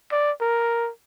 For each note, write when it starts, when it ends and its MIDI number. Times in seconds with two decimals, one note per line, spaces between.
0.12 0.32 74
0.41 0.90 70